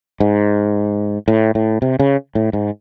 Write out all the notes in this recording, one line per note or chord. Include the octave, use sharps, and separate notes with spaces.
G#2
A2
A2
C3
C#3
A2
G#2